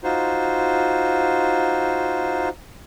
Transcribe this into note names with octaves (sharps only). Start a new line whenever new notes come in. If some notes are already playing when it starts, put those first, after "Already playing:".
D#4 F4 F#4 C5